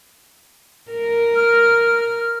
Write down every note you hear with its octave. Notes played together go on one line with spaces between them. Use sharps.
A#4
F6